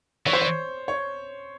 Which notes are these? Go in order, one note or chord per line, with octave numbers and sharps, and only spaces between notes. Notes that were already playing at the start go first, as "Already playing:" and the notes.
E3 C#5
C5
C#5
C#5